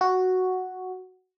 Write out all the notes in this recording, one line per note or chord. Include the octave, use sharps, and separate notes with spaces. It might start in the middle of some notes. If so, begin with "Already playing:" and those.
F#4